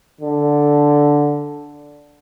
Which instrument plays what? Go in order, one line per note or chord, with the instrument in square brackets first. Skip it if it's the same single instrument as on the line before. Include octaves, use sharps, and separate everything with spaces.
[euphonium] D3